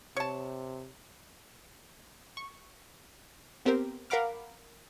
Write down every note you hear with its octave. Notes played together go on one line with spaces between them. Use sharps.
C3 C#5 A5
C#6
B3 C4 G4 A#4 C5
A#4 F5 F#5 B5 D6 F6